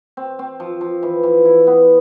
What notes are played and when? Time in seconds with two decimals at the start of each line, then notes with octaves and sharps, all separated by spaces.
0.17 C4
0.39 C4
0.60 F3
0.81 F3
1.03 E3
1.23 E3
1.45 E4
1.67 B3